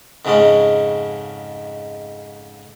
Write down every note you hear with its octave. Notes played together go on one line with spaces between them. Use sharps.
F2 G#2 C#3 G#3 C#4